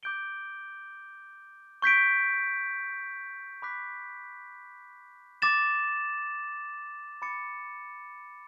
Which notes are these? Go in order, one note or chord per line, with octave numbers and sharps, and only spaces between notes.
D6 G6 D7 G7
C#6 G6 B6 D7
B5 D6 F#6 B6
D6 A6 E7
B5 D6 A6 C#7